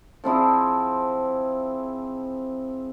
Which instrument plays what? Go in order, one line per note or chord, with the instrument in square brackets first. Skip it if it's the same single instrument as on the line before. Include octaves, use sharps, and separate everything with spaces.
[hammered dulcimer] F3 C4 E4 G#4